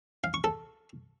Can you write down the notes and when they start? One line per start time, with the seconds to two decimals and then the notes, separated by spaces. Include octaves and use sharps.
0.24 F5
0.34 C#6
0.44 A4